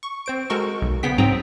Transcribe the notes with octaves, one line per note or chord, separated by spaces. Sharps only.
C#6
C4 C5 D7
G#3 F#4 A4 A#4 C#6
B1
C#3 B3 G#4 G5 B6
G#2 F#3 C4 G5 A#5 D#6